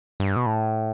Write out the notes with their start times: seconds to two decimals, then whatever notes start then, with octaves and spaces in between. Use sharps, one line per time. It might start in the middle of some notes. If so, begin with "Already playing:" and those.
0.20 G2
0.36 B2
0.46 A2